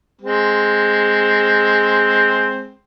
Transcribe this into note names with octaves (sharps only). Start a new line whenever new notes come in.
G#3 C4